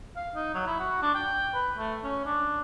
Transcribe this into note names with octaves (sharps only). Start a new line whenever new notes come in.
F5
D#4
F#3
E4
F#4
D4
G5
B4
A3
C#4
D4